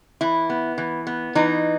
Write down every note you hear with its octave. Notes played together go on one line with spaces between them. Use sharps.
E3 E4
B3
E3
B3
E3 D#4